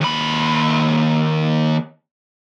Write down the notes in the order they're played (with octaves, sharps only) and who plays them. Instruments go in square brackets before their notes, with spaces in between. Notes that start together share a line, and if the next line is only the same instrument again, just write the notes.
[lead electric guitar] D#2 B5